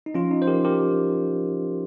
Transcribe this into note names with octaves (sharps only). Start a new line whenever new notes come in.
D#4
F3 C#4 F4
D#4
C5
F3 G4 A#4
G4 A#4